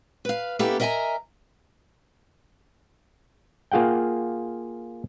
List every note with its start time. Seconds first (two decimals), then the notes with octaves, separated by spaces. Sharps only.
0.25 B4 F5
0.59 A#3 B3 C#4 E4 G4 A4
0.80 A#4 D#5 E5 F#5 G#5 A#5
3.72 A#3 F4 G#4 F#5 G5